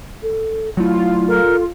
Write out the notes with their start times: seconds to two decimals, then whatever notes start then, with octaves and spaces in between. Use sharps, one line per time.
0.22 A4
0.77 F#3 A3 E4 F4
1.28 A4 A#4